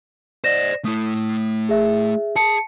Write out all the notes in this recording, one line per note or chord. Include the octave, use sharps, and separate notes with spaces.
C5 D5 D#5 A#6 E7
A3 E4 D#6
G#4 E5
G#4 A5 C#7